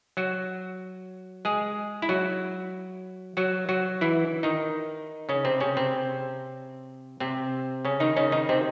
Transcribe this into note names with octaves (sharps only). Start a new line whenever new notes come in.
F#3 F#4
G#3 G#4
E4
F#3 F#4
F#3 F#4
F#3 F#4
E3 E4
D#3 D#4
C#3 C#4
C3 C4
C#3 C#4
C3 C4
C3 C4
C#3 C#4
D#3 D#4
C#3 C#4
D#3 D#4
C3 C4